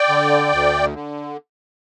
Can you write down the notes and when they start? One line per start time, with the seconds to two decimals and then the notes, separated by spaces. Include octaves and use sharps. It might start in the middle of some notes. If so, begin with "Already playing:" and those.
Already playing: D5 G5
0.09 D3
0.52 D2
0.94 D3